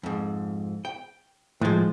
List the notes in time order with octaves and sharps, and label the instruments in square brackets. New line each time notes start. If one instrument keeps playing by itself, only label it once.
[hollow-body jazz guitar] F2 G#2
G5
[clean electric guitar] A2 F3 [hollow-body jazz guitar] D#3 G#3